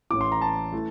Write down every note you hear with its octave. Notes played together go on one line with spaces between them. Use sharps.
A1 A2 E3 D6
C6
A#5
A5
E3 A3